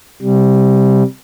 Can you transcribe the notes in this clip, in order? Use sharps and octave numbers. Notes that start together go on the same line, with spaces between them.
C3 G3